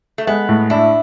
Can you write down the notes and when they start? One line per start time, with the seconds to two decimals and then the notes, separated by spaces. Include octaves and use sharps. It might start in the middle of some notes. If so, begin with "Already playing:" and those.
0.18 A3
0.27 G#3 B3
0.49 A2
0.70 D4 E4